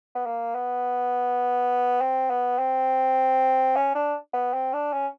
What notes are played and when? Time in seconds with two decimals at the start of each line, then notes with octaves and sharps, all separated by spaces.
0.15 B3
0.26 A#3
0.55 B3
2.01 C4
2.30 B3
2.58 C4
3.76 C#4
3.95 D4
4.33 B3
4.53 C4
4.73 D4
4.93 C#4